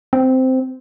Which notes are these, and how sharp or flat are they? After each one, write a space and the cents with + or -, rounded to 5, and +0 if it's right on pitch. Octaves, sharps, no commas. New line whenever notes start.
C4 -10